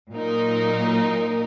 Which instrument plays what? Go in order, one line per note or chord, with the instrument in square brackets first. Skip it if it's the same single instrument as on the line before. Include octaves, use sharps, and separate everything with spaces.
[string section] A#2 F#3 D#4 A#4